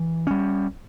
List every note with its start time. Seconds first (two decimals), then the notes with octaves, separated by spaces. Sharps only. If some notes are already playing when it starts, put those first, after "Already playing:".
Already playing: E3
0.27 G3 C#4